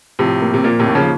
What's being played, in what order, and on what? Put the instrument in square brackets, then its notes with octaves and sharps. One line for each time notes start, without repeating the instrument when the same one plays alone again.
[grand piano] A2 C3 [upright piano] F3
[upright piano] A#3
[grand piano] C3
[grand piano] A#2 [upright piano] A#3
[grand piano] A2 C3
[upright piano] D#2
[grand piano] C#3 F3